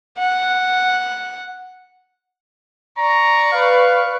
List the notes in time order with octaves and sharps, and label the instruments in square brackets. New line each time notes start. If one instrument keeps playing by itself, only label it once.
[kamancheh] F#5
[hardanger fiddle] D5 C#6 [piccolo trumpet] A#5
[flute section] B4 [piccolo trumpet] F5